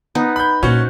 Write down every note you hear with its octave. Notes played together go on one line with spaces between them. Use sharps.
B3 D#4
B5 G6
A#2 C#4 F#4 C5